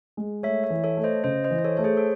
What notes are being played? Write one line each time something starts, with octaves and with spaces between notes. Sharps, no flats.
G#3
A3 C#5 E5
C#5 E5
E3
A4 C#5
A3
C5 D#5
C#3 C5 D#5
C5 D#5
E3
C5
A4 C#5
A3 C#5
G#4 C5
A4